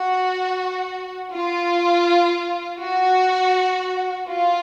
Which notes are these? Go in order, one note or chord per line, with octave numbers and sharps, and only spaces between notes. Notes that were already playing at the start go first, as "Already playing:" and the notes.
Already playing: F#4
F4
F#4
F4